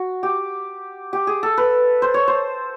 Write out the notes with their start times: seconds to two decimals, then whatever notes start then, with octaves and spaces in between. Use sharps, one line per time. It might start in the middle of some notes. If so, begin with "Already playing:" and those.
Already playing: F#4
0.23 G4
1.13 G4
1.27 G#4
1.43 A4
1.57 B4
2.02 C5
2.14 C#5
2.28 C5